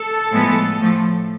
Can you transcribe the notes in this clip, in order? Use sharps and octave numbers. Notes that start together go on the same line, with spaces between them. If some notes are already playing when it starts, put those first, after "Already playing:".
Already playing: A4
A2 F3 G#3 B3
A2 F3 A3